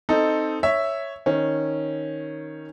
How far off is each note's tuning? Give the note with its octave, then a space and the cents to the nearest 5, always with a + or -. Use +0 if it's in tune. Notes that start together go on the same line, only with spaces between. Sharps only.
C4 +0 D#4 +0 A4 +0
C#5 +0 E5 +0
D#3 +0 C#4 -10